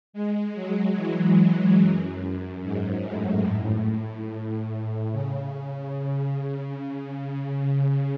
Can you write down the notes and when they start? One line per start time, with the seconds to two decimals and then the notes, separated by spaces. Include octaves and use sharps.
0.13 G#3
0.55 F#3
0.97 E3
1.79 F#2
2.21 F#2
2.63 G#2
3.04 A2
5.12 C#3